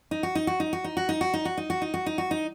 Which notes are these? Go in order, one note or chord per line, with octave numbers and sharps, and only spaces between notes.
D#4
F#4
D#4
F#4
D#4
F#4
D#4
F#4
D#4
F#4
D#4
F#4
D#4
F#4
D#4
F#4
D#4
F#4
D#4